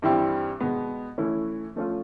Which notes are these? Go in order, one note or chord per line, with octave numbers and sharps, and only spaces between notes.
G2 E3 G3 C4 E4
B2 G#3 B3
E3 A3 C#4 E4
F3 A3 C#4 F4